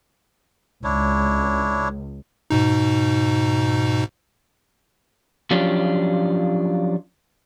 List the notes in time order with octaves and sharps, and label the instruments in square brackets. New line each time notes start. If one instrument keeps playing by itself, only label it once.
[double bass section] C#2 [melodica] D4 E4 C#5
[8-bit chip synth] G#2 B2 D#4
[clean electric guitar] F3 F#3 C#4 D4 F4 G4